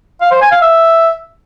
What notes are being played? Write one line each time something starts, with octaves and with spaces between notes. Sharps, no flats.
F5
C5
G#5
F5
E5